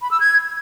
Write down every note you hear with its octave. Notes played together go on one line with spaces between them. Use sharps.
B5
E6
G#6